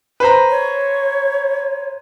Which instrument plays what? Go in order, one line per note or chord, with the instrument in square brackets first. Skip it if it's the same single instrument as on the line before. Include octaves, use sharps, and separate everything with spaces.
[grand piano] B4 C5 A#5
[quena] C#5